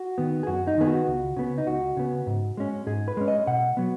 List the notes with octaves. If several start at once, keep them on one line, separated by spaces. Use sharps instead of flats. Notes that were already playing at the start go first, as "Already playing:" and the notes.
Already playing: F#4
D#3 B3
G#4
F#2 F#4
D#4
D#3 B3 G#4
F#4
C#2
C#3 B3
D#4
C#2 F#4
C#3 B3
G#2
G#3 C#4
G#2 G#4
B4
G#3 C#4
D#5
B2 F#5
F#3 B3